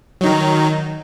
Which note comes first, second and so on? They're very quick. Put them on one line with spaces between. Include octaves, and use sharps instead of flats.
F#3 D#4 D#3